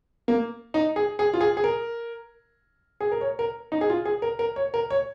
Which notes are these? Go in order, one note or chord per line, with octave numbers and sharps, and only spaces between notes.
A#3
D#4
G#4
G#4
F4
G#4
G#4
A#4
G#4
A#4
C#5
A#4
D#4
G#4
F4
G#4
A#4
A#4
C#5
A#4
C#5